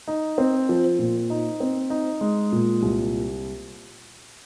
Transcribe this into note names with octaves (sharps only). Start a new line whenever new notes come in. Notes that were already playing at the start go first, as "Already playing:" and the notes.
D#4
C4
F3
A#2
D#4
C4
D#4
G#3
A#2
C2